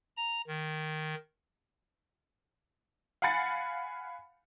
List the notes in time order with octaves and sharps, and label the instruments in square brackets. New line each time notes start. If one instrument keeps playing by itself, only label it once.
[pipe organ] A#5
D#3
[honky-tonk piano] F5 F#5 G#5 B5 A6 C#7